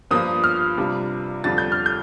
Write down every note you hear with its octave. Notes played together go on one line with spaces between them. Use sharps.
G2 F3 A#3 F4 D#6
F6
C3 G3 D4 F4
F2 D3 G3 D4 F4 A6
G6
F6
G6